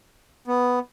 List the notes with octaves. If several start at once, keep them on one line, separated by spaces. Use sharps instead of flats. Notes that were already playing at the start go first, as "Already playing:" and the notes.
B3